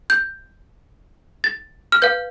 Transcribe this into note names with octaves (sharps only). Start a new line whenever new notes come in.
G6
A6
F6
B4 F5 G6